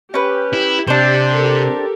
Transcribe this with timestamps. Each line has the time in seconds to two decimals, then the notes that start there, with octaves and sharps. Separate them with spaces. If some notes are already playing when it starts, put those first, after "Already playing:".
0.14 C#4 G4 B4
0.53 E4
0.87 C3 D4 G4 C5
1.33 G4 A4 A#4